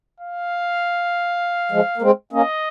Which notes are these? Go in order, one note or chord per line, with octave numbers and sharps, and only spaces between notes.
F5
F3 G#3
A#3
G#3 C4
A#3 C#4 D#5